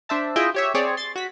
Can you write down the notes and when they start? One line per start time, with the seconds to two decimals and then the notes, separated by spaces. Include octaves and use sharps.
0.09 D4 C5 E5 A5
0.36 E4 F4 G#4 D#5 E5 G5
0.54 G4 C#5 E5
0.74 C4 G#4 C#5 D5
0.97 C6 A6
1.16 F#4 B6